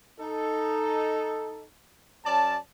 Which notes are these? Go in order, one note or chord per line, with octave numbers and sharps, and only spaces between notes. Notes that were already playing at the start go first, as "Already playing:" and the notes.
D#4 A4
F#2 C#4 D5 A5